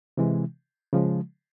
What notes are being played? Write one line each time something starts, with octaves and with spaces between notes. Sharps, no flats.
C3 E3 G#3
C#3 F3 G#3